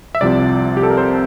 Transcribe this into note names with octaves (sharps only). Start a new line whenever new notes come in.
E5
C2 C3 F3 C4 D5
G4
A4
A#4
C5